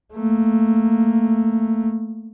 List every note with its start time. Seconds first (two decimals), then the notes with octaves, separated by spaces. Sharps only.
0.13 A3 A#3